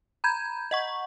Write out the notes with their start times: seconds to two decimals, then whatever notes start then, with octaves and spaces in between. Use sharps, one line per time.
0.24 A#5 B5 G6 G#6
0.71 D#5 F#5 C#6